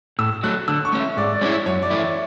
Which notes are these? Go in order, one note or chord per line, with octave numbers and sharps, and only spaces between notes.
A2 E6
F#3 A3 F#6
D3 E6
C#6
A3 C#4
E5
G#2 D5
D5
G#3 C#4 E4 C#5
F#2 C#5
D5
E3 A3 E4
E5